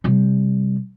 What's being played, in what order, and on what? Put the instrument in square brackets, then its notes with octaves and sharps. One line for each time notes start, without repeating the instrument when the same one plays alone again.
[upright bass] C3 G3